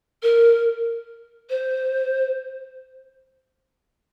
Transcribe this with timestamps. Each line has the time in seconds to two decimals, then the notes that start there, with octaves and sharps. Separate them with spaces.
0.23 A#4
1.50 C5